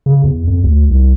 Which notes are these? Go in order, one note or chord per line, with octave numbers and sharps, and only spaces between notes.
C#3
E2
F2
D2
C2